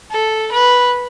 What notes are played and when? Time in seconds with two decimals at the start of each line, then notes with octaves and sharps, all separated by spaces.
0.11 A4
0.52 B4